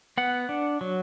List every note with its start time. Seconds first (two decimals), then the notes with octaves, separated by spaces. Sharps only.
0.18 B3 F#5
0.49 D4
0.81 F#3